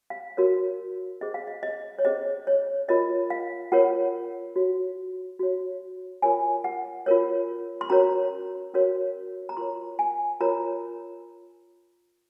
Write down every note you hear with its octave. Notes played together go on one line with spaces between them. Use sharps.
F5
F#4 A#4 C#5
C#4 G#4 C5 D#5
F5
D#5
D#5
C#5
C#4 G#4 C5 D#5
C#5
F4 A#4 C#5 D#5
F5
F4 A#4 C#5 F#5
F#4 C#5
F#4 C#5
F4 A#4 C#5 G#5
F#5
F4 A#4 C#5
C6
C#4 F#4 A#4 C#5 A#5
C#4 F#4 A#4 C#5
A#5
F4 A#4 C#5 C6
G#5
F4 A#4 C#5 A#5